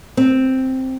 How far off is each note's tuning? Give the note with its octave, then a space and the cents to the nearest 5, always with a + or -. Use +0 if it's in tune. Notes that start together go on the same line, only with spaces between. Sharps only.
C4 +0